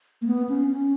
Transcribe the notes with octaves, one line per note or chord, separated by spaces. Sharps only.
A#3
B3
C#4
C#4